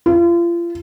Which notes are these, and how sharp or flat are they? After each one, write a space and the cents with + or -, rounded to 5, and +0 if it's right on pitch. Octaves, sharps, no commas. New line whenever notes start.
F4 -35